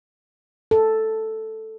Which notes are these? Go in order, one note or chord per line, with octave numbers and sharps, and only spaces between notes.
A4